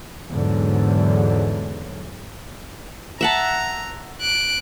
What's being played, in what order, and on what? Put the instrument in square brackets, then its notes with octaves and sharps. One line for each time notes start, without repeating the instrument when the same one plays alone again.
[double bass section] E2 G#2 D3 F#3
[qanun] E5 F#5 A5 [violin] A#5
[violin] F#6 D7